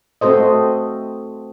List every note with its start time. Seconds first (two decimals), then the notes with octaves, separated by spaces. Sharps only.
0.21 A3 C4 F#4 A4 C5 D#5